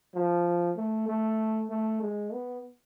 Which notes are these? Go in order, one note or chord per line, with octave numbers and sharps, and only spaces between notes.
F3
A3
A3
A3
G#3
B3